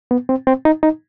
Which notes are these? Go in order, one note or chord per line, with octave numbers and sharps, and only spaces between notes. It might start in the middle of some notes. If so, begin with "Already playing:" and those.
B3
C4
C4
D#4
D#4